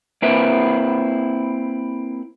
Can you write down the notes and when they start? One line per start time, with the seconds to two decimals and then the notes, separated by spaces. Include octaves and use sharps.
0.22 A#3 C4 E4 B4